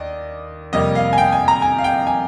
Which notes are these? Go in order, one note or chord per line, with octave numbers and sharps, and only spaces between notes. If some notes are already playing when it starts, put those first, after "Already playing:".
Already playing: D#2 D5 D#5
F2 C3 G3 A#3 D#5
F5
G#5
G5
G#5
A#5
G#5
F5
G5
G#5